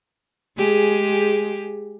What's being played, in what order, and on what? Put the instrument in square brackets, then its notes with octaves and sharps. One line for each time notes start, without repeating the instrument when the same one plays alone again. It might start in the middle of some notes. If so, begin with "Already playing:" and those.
[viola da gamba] G#3 G4 G#4